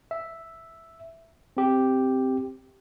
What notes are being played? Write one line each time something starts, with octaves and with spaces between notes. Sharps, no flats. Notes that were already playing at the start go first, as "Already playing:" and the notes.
E5
C4 G4